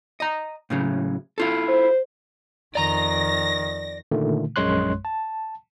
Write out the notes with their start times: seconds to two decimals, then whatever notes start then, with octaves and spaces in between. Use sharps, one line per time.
0.20 D#5 A#5
0.70 A2 C#3 F#3
1.38 E4 F4 A4
1.69 C5
2.75 F2 D#3 D5 A#5 A#6
4.12 A#2 D3 D#3 A3
4.56 A#1 F#2 G#3 C#5 C6 F#6
5.05 A5